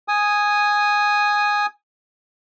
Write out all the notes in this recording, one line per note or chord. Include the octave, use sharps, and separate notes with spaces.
G#5 D#6